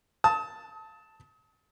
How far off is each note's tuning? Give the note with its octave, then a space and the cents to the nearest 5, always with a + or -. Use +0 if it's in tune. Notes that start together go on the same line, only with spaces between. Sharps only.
A5 +0 D#6 +40